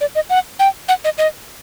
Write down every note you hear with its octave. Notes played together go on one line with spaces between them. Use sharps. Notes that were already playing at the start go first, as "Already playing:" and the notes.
D5
D#5
F#5
G5
F#5
D#5
D#5